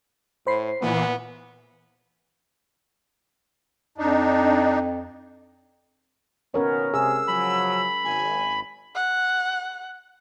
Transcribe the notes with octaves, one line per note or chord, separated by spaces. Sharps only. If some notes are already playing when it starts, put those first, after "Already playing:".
A2 C5 B5 C7
A#2 E3 B3
F2 D4 D#4
B2 D#3 B3 C#4 A#4 C#5
C3 G#4 E6
C#3 F3 F#3 B5
G#1 G#5
F#5